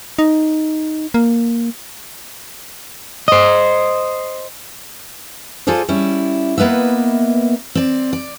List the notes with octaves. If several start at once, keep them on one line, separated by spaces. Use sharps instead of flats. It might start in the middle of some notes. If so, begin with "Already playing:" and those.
D#4
A#3
C5 D#5
F4 G#4 A4 C5 D5
G3 C#4 E4
A#3 B3 B4 D#5 E5
C4 D5
D5